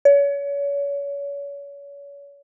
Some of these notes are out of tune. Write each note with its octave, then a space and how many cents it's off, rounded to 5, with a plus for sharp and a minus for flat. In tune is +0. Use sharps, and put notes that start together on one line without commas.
C#5 +35